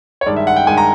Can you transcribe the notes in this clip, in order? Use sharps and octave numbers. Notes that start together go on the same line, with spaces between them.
C#5
G2 D#3 G#3 D5
E5
F#5
G5
G2 D#3 G#3 G#5
A#5